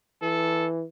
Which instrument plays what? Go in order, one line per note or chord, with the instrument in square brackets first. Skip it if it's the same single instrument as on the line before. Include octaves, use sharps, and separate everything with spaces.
[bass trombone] E3 [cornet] A4